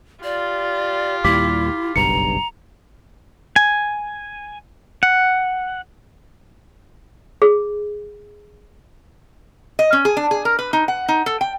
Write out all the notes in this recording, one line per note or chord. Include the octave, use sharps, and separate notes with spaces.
F4 G4 D5
D#2 A#2 G3 E4 D6 B6
F#1 B1 G2 A#5 C#7
G#5
F#5
G#4
D#5
C#4
G#4
D4
G#4
A#4
B4
D#4
F#5
D#4
A4
G5